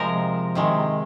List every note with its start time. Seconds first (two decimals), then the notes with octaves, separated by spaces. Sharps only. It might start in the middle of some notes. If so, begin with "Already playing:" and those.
Already playing: C3 F3 G#3 A#4
0.55 C3 D#3 G#3